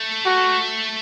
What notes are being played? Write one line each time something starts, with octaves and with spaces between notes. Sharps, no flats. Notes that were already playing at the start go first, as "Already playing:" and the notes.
Already playing: A3
F#4